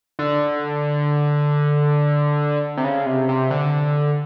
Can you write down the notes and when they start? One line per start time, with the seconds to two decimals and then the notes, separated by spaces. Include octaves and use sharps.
0.19 D3
2.77 C3
2.84 C#3
3.06 C3
3.29 C3
3.50 D3